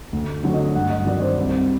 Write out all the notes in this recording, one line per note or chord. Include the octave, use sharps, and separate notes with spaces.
D2
D3 F#3
D#5
G2 F#5
D#5
D#3 F#3 D5
C5
C2